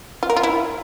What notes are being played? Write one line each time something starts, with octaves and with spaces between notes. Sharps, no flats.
F4
A#4
F4
E4